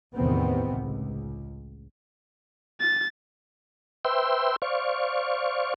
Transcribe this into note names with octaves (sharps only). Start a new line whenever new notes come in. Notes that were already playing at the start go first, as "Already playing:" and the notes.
A1 E2 C3 D#3 B3 C4
C#2
A6
B4 C5 E5 G5 C6 E6
C5 D5 F5 C#6